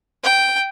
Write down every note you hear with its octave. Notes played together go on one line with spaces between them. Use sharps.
G5